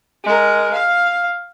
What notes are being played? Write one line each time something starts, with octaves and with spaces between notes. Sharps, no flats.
G#3 A#4
F5